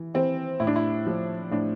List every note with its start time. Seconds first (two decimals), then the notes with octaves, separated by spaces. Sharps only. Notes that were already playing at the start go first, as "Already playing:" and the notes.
Already playing: E3
0.14 E3 C4
0.60 A2 E4
0.67 D4
0.76 E4
1.06 F3
1.51 A2 D4